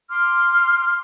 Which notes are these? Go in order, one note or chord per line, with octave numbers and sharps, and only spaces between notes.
C6 D6 F6